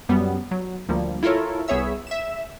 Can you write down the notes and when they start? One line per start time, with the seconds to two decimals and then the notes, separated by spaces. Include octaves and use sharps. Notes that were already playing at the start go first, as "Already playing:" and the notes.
0.09 F#2 F#3 G3 B3
0.51 F#3
0.88 D2 F3 G3 A#3
1.23 E4 F4 A4 A#4 C#5
1.68 C2 B3 G#4 C#5 E5 E6
2.07 E5 E7